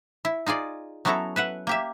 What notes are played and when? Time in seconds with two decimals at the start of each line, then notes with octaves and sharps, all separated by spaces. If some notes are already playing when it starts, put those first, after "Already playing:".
0.25 E4
0.46 D#4 F4 G#4 D5
1.05 F#3 B3 C#4 E4 A4 A#5
1.36 B4 E5 F#5
1.67 A#3 G4 E5